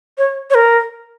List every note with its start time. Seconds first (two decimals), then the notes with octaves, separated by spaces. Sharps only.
0.18 C#5
0.50 C#5
0.55 A#4